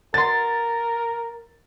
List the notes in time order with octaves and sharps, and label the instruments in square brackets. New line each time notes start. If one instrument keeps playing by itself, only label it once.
[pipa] B2 C6 [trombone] A#4 [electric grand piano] A6